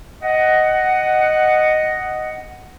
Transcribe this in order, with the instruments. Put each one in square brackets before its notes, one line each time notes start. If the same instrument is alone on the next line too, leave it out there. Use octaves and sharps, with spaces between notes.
[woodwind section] D#5 F#5